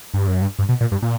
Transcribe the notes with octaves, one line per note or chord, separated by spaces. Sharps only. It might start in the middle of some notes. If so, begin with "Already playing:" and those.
G2
F#2
G2
G2
B2
A#2
G2
A#2